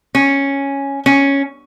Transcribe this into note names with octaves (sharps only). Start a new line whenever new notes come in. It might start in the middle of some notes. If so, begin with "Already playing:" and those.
C#4
C#4